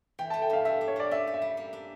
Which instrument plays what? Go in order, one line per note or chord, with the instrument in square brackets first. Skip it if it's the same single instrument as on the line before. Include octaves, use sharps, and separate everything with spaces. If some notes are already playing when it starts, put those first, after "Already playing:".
[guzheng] E3 [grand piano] G5
[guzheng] A3 [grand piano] A5
[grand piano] G5
[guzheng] G2 [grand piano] F5
[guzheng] A3 [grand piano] E5
[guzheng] D4
[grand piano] C#5
[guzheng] A#2 [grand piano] D5
[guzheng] C#4 [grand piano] E5
[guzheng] G4
[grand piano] E5
[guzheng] G3
A#3
D4